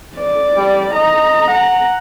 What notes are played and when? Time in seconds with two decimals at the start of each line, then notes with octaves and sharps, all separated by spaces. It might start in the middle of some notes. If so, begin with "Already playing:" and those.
0.16 D5
0.56 G3
0.94 D#5 A#5
1.48 F#5